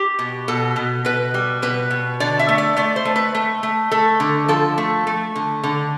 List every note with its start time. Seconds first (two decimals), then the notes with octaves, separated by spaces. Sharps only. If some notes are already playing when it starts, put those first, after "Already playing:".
Already playing: G4
0.19 B2
0.48 B2 A4
0.76 B2
1.05 B2 B4
1.34 G3
1.62 B2 B4
1.91 B2
2.20 D3 D5
2.39 E5
2.49 A3
2.58 D5
2.77 A3 D5
2.96 C5
3.05 A3
3.16 B4
3.35 A3
3.63 A3
3.91 A3 A4
4.20 D3
4.48 F3 A4
4.78 A3
5.07 A3
5.35 D3
5.63 D3